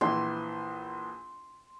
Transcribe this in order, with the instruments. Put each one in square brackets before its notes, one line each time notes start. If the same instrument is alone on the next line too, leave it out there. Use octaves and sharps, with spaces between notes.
[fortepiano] A#1 E3 [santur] C6